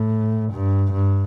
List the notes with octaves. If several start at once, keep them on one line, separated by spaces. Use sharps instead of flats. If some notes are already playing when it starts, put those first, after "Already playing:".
Already playing: A2
G2
G2